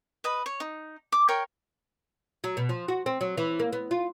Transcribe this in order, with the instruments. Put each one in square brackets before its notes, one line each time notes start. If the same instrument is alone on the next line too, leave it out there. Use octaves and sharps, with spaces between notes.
[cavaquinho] B4 D#5 B5
C#5
D#4
D6
A#4 C#5 G5
[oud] F#3
B2
F3
F#4
C4
F#3
E3
A#3
B3
F4